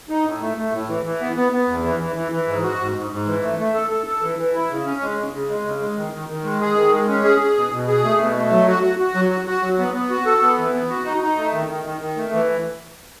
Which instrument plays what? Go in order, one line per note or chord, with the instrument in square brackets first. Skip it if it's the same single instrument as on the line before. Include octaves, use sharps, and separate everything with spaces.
[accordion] D#4
A2
A3
A3
A2
E3
E3
B3
B3
B3
E2
E3
E3
E3
E3
G#2
F#4
G#2
G#2
G#2
E3
A3
A3
A4
A4
A4
E3
E3
E4
C#3
C#4
G#3
C#3
C#3
G#3
C#3
G#3
D#3
D#3
D#3
G#3
G#4
D#3
G#3
C#4
G#4
G#4
B2
B2
G#4
A3
B2
A3
F#3
F#4
F#4
F#4
F#3
F#4
F#4
F#3
B3
B3
F#4
A4
B3
E3
B3
F#4
D#4
D#4
A3
D#3
D#3
D#3
D#3
A3
E3